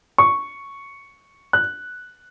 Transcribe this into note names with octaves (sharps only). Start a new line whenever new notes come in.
C#6
F#6